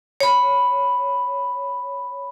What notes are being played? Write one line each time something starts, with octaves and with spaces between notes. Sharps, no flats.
C#5 B5